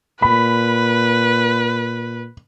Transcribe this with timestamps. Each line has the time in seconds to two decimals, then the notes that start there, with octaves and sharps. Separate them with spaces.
0.22 A#2 B4 B5